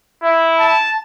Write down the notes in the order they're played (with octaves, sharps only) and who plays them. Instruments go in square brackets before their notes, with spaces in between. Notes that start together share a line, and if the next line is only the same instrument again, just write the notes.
[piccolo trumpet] E4
[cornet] A5